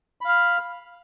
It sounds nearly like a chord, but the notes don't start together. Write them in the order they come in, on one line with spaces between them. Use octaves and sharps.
B5 F5 F6